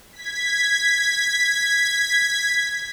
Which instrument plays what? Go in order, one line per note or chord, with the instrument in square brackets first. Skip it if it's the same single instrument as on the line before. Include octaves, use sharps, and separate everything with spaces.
[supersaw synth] G#6 B6